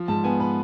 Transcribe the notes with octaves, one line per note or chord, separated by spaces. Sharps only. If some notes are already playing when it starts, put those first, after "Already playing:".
Already playing: F3
G#2 A5
B3 G#5
B4